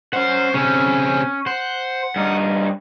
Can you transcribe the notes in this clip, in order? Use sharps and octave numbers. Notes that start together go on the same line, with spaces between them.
C#4 C5 F#5
C#3 C4 C#4
C5 F#5
G2 D#4